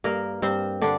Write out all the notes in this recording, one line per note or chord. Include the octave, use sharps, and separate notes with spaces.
G2 A#3 A#4
G2 C4 C5
D3 D4 D5